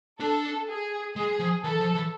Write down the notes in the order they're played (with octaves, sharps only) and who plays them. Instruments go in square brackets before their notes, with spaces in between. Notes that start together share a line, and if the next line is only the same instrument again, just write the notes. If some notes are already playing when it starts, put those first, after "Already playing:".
[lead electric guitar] D4 [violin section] A4
[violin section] G#4
[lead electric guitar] G#3 [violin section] G#4
[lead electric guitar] F3
[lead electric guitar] E3 [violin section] A4
[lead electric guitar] F3
E3